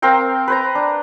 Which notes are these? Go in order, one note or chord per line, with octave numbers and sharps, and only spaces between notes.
C4 A#4 F5 G5
B4 C5 A#5
D4